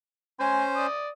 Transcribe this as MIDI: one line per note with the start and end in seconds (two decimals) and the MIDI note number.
0.40 0.87 61
0.40 0.87 72
0.40 0.66 80
0.40 0.66 84
0.76 1.09 74
0.76 1.09 87